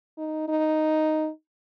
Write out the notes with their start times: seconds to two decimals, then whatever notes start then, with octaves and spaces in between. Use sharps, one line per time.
0.17 D#4
0.48 D#4